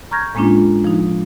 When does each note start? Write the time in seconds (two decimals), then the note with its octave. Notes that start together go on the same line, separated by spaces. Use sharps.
0.11 A#5 C#6 F6 G6 G#6 A#6
0.35 A2 G#3 A#3 C#4 D4 F4
0.84 F3 D#4